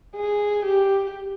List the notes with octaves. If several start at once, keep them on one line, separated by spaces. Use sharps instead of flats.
G#4
G4